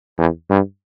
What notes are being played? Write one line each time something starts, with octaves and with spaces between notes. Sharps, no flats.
E2
G2